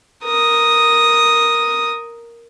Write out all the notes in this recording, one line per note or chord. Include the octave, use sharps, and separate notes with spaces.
A#4 D#6